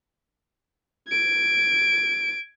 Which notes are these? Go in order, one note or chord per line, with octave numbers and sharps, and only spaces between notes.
G#6 D7